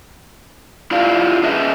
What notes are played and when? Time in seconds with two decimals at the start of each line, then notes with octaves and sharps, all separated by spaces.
0.91 E4 F4 G4 D5 F5
1.43 C#4 G#4 B4 D#5 E5